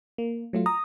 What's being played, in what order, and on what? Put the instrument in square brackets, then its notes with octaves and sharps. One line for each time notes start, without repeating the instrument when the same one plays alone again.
[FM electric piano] A#3
F#3 A3 F4
[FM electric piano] A#5 [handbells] D#6